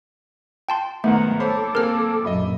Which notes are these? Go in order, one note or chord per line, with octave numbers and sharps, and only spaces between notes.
G5 A5 C6
G#2 D#3 A3 B3 F#5 A#5
A4 C5 C#5 B5 D6
A#3 C4 G#4 A#4 F6
A#1 F#2 D#5 E5 B5